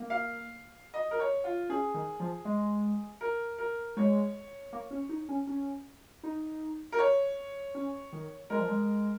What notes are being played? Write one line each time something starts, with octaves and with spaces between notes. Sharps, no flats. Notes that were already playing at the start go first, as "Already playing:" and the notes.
Already playing: A#3
F5
D#5
A#4
C#5
F4
C#4 G#4
D#3
F3
G#3
A#4
A#4
G#3 C#5
A#3
C#4
D#4
C#4
C#4
D#4
A#4
C#5
C#4
D#3
G#3 A#4
F3
G#3